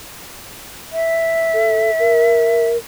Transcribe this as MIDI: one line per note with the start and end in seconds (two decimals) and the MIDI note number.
0.92 2.68 76
1.54 1.90 69
1.99 2.77 70